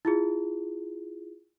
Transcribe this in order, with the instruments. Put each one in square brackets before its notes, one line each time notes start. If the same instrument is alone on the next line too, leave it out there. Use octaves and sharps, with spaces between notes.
[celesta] E4 F4 G#4